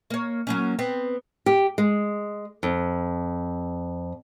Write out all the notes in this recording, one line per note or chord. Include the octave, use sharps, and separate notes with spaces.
A#3 C#5
F#3 A#3 C#4
B3 C4
G4
G#3
F2